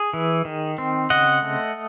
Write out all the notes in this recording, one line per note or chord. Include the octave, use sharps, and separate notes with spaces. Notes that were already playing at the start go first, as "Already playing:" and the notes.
Already playing: G#4
E3
D#3
C4
C#3 D#5 F#5
A3